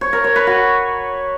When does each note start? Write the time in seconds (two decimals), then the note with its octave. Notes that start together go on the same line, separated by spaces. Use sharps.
0.01 C#5
0.13 A#4
0.24 C#5
0.36 B4
0.47 F#4